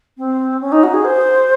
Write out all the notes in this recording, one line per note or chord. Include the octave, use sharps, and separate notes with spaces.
C4
C#4
D#4
F#4
G#4
C5